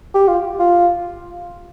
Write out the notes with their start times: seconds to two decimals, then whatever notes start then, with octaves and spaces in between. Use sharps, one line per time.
0.15 G4
0.28 F4
0.59 F4